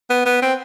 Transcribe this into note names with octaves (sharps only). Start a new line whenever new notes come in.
B3
B3
C4